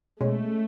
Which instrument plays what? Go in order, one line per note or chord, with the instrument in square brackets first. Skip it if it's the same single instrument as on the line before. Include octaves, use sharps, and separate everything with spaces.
[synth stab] B2 G#3 C#4 [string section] A3